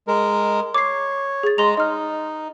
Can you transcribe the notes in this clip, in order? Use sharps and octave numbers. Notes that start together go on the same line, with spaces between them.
G#3 A#4
C#5 D6 C7
G#4 A6
G#3 A#5 C6 F7
D#4 D#5 F6